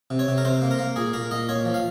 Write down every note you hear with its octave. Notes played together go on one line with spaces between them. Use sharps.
C3
C#5
C3
A#4
C3 C5
A#3
A#4
A#3
A#2 G#4
A#2 A#4
A#2 D#5
A#2 C#5
F3
F5